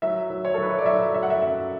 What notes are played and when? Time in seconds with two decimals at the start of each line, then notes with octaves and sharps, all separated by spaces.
0.02 F#3 E5
0.30 F#3
0.45 C#5
0.54 A4
0.58 F#3 B4
0.70 C#5
0.79 D5
0.86 F#3 E5
1.14 F#3 E5
1.23 F#5
1.30 E5
1.42 F#2 E5